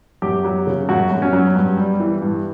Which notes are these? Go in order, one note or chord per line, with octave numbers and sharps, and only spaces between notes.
F#2 G4
F#3
C#3
F#2 F#4
F#2
C#4
F#3
G2
G3
E3
G2